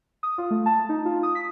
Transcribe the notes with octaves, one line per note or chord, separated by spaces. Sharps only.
D#6
F4
A3
A5
D#4
F4
D#6
B6